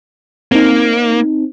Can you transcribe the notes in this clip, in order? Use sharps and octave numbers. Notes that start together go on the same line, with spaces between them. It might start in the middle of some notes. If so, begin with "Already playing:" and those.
A#3 C4 D#4